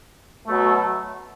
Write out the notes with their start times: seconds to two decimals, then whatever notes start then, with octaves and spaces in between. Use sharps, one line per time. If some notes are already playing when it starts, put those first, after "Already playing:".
0.47 B2 F#3 A3